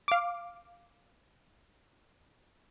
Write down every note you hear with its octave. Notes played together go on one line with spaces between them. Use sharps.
F5 D6